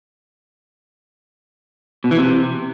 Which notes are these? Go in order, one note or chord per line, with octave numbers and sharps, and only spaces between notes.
B2
E3
C3